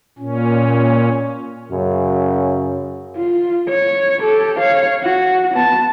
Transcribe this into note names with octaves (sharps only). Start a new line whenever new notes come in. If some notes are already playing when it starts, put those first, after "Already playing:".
A#2 C#4
F#2 C#3 F#3
F4
C#5
G4 A4
C#5 F5
F#4
B3 A5